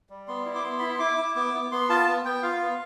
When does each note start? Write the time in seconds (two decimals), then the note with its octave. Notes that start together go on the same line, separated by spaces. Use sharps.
0.10 G3
0.28 B3 C6
0.46 E4
0.55 D6
0.64 B3 C6
0.79 E4 B5
0.89 C6
0.99 E4 D6
1.18 E4
1.36 B3 D6
1.54 B3
1.71 B3 C6
1.89 F4 A5
2.07 B3
2.25 B3 G5
2.43 F4 F5
2.61 B3